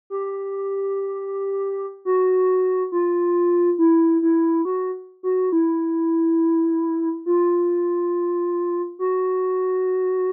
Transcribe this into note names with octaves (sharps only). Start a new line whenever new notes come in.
G4
F#4
F4
E4
E4
F#4
F#4
E4
F4
F#4